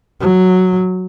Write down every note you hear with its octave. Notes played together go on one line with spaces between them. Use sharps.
F#3